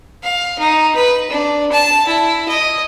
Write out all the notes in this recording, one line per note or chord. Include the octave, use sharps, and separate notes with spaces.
F5
D#4
B4
D4
A5
E4
D#5